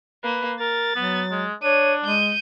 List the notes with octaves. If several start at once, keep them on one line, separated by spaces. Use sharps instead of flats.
A#3 B4
A#4 A6
F#3 B3
G#3
D4 C#5 D#7
G#3 G6 D#7